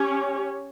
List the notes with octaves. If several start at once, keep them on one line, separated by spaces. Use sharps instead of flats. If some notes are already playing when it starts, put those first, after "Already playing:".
Already playing: C#4 G4 C#5